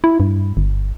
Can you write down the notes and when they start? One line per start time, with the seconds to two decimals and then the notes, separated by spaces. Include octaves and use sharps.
0.04 E4
0.20 G2
0.57 G1